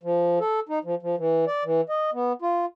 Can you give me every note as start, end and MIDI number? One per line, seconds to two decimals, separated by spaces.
0.03 0.39 53
0.40 0.60 69
0.69 0.79 63
0.84 0.95 53
1.02 1.15 53
1.18 1.45 52
1.47 1.64 74
1.65 1.81 52
1.89 2.10 75
2.13 2.33 59
2.42 2.65 65